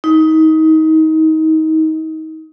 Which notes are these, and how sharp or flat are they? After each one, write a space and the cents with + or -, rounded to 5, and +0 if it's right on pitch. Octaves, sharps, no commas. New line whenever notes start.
D#4 +25